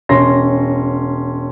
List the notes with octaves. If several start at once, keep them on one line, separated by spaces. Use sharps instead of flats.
E1 C#4 C6 A#6